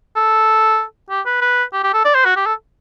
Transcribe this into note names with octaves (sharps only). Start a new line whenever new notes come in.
A4
G4
B4
B4
G4
G4
A4
D5
C5
F#4
G4
A4